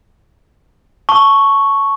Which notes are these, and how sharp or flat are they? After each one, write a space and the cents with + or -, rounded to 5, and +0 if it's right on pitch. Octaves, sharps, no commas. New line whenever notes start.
A5 +0 C#6 +0